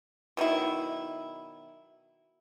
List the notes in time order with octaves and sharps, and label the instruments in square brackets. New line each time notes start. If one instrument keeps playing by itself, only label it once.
[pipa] B2 D#3 F#3 E4